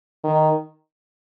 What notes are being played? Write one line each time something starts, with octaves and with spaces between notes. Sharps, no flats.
D#3